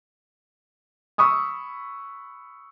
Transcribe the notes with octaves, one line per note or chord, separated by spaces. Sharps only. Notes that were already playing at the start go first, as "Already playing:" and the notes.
B5 C#6 D#6 E6